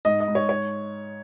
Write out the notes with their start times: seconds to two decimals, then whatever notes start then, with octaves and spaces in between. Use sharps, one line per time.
0.05 G#2 D#5
0.20 D#5
0.28 G#2
0.35 C#5
0.49 C#5